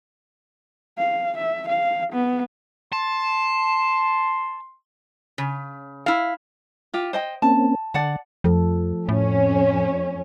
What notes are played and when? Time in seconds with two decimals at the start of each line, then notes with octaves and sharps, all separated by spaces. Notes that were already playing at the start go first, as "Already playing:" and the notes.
0.99 F5
1.38 E5
1.69 F5
2.13 B3
2.92 A5 C6
5.38 C#3
6.06 E4 F5
6.94 F4 G4
7.13 C5 D#5 G5
7.42 A#3 C4 C#4 A5
7.94 D3 D5 F#5 A5
8.44 F2 F3 A3 A4
9.09 F2 A2 C#4